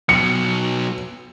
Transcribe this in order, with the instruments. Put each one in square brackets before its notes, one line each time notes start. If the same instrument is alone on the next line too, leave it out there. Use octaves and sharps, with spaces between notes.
[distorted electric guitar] B2 F#3 [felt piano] C#7